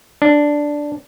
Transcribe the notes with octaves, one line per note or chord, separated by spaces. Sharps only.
D4